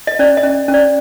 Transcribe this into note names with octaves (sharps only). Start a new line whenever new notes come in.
D#5
C#4 D5
D#5
C#4
C#4
D5